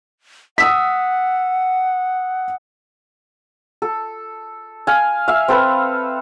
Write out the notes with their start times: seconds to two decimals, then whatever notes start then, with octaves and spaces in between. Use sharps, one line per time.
0.58 F#5 D#6 E6 B6
3.82 A4
4.87 F5 G#5
5.28 E5 F5
5.48 C4 A4 B4